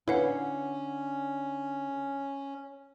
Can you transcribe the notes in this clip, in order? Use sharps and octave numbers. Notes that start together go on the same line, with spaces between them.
D3 C#4 E4 B4 C#5 F5 F#5